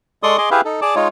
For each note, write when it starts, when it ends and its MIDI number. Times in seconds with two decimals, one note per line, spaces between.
0.23 0.37 56
0.23 0.37 69
0.23 0.37 74
0.23 0.37 84
0.23 0.37 85
0.23 0.37 87
0.38 0.49 68
0.38 0.49 75
0.38 0.49 84
0.38 0.49 86
0.51 0.61 64
0.51 0.61 67
0.51 0.61 68
0.51 0.61 71
0.51 0.61 76
0.51 0.61 77
0.65 0.80 63
0.65 0.80 69
0.82 0.95 68
0.82 0.95 74
0.82 0.95 81
0.82 0.95 86
0.95 1.08 56
0.95 1.08 63
0.95 1.08 65
0.95 1.08 73